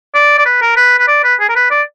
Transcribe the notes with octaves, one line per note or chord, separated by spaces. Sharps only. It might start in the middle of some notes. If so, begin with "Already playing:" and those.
D5
D5
B4
A#4
B4
B4
D5
B4
G#4
A#4
B4
D5